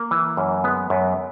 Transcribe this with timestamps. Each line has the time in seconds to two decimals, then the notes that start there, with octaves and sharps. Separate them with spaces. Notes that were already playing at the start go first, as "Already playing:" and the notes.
Already playing: A#3
0.11 E3
0.37 F#2
0.64 G#3 B3
0.90 F#2